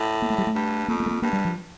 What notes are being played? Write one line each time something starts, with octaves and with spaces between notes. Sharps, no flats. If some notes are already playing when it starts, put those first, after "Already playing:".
Already playing: A2
A#3
A3
G3
A3
G2
F2 A#3
A#3
A3
A#3
G2 A#3
G3
F3